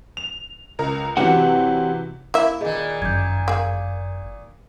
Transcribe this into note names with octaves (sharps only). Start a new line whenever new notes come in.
F7
C#2 A#4 A#5
C3 E3 F#3 C4 G4 F#5
A#3 E4 E5
A#2 D#3 G#4 D#5
G1 F#2 G6 G#6
A#3 G#4